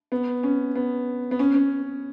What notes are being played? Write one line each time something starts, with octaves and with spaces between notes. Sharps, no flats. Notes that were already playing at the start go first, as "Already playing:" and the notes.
B3
C#4
B3
B3
C#4
C#4